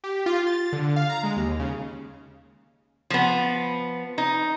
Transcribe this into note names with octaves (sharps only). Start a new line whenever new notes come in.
G4
F4
A6
D3
F5
A#5
G#3
D#2
C#3
F3 B3
D#4